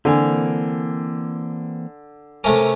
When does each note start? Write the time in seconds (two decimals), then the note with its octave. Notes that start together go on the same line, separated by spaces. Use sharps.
0.05 D3 E3 A#3 C4 G#5
2.44 C3 A3 C#4 A#4